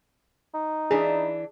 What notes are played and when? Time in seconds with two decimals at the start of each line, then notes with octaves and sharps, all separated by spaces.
0.54 D#4
0.91 E3 D4 E4 G#4